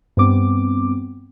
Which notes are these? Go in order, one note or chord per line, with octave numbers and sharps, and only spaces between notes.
G2 B3 C4 D6